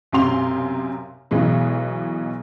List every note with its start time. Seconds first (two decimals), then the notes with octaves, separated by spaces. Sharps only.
0.12 B1 F#2 C3 F5 C6 F7
1.31 B1 B2 E3 G#3